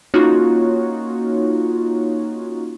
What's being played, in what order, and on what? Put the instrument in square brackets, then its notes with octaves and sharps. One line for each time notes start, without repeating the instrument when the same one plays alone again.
[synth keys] A#3 C#4 D#4 F4 F#4 C#5